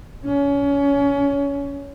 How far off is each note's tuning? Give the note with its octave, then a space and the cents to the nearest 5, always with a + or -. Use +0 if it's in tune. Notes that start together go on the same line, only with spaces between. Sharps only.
C#4 +25